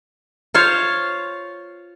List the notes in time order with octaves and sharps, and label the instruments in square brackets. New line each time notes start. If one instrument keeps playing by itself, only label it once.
[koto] F4 C5 C#5 F5